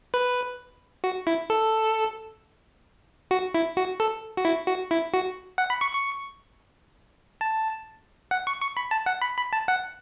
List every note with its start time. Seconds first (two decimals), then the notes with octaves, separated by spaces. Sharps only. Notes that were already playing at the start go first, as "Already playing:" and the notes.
0.14 B4
1.04 F#4
1.27 E4
1.50 A4
3.31 F#4
3.54 E4
3.77 F#4
4.00 A4
4.37 F#4
4.45 E4
4.67 F#4
4.91 E4
5.14 F#4
5.58 F#5
5.70 B5
5.81 C#6
5.93 C#6
7.41 A5
8.31 F#5
8.47 C#6
8.62 C#6
8.77 B5
8.91 A5
9.06 F#5
9.22 B5
9.37 B5
9.53 A5
9.68 F#5